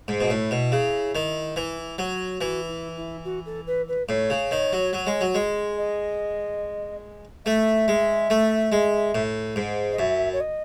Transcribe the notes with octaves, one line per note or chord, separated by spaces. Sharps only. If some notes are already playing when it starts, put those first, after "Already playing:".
G#2
B2
A2 E4
B2
C#3
D#3
E3
F#3
E3 F#4
E4
E4
F#4
A4
B4
B4
A2 C#5
C#3
D#3
F#3
F#3
G#3
F#3
G#3
D#5
A3 E5
G#3
A3
G#3
A2
G#2
D#5
F#2 E5
C#5
D#5